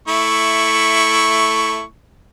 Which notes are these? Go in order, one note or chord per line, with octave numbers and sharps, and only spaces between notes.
A3 E4 C#6